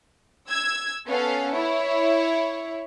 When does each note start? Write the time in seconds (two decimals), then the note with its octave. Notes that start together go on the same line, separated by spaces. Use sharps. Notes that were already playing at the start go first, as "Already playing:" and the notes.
0.48 E6 G#6
1.07 B3 C#4 A4 F5
1.52 E4 C#5